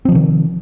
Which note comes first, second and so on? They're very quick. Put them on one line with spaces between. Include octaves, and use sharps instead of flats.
C4 F3 C3 D#3